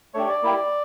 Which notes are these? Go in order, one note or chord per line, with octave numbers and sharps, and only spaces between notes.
A3 D4 G4 C#5
D5
A#3 E4 G4